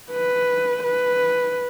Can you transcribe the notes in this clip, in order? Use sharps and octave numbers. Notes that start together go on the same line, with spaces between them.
B4
B4